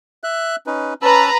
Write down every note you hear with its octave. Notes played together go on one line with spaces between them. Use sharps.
E5 F#6
C#4 D#4 B4
C#4 B4 A5 A#5 E6